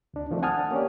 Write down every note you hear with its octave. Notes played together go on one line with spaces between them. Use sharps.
D2 D4
D#3 F3 A3 C4 D4
F#5 G#5 A5 D#6 F6
A#3 C#4 G4 C#5 D5